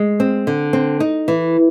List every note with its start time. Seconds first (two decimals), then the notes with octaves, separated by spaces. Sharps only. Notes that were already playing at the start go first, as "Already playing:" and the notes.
Already playing: G#3
0.20 C4
0.47 D3
0.73 C4
1.00 D#4
1.28 E3